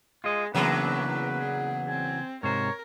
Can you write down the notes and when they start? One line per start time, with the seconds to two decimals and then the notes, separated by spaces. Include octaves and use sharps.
0.24 G#3 F4 D#5
0.55 E2 C#3 F#3 A#3 B3 D4 B4
1.38 G#4
1.89 C4 G#5
2.43 G#2 C3 A#4 C5 C#5